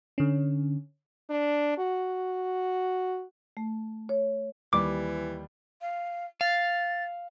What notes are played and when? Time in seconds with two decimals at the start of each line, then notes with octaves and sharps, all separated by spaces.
0.18 D3 C#4
1.30 D4
1.78 F#4
3.57 A3
4.09 C#5
4.73 D#2 E3 G3 D6
5.81 F5
6.41 F5 A6